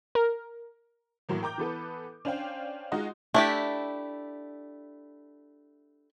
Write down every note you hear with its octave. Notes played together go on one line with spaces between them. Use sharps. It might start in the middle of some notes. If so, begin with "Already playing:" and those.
A#4
A2 E3 F#3 A#3
A#4 G5 A#5 D6 G6
E3 B3 A4 B4
C#4 D4 C5 F5 G5
G#3 D#4 F4 F#4 D#5
A3 D4 E4 G4